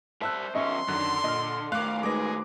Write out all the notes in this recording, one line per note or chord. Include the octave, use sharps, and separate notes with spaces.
G3 C5 E5 A5 E6 F#6
E2 C#4 D#5 E5 C6 C#6
F#2 D3 D#3 F#3 F#6
A#2 D#5 F6
D#3 A3 F5 D6 F#6
G#3 D#4 G#4 B4 D6 A#6